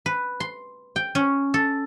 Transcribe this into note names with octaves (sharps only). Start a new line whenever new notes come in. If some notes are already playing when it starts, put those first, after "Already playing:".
B4
C6
G5
C#4
A4